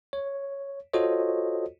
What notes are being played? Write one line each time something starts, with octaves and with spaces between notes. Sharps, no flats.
C#5
F4 F#4 A4 C5 C#5 D#5